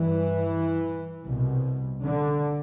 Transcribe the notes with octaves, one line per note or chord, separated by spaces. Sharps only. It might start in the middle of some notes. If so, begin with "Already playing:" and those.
Already playing: G2 E3
C2 B2
D3